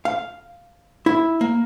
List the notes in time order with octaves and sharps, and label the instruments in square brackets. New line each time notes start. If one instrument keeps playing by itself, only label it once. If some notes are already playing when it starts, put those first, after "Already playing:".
[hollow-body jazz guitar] F5
E4
A#3